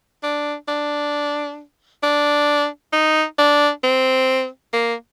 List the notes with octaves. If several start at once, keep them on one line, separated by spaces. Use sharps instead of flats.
D4
D4
D4
D#4
D4
C4
A#3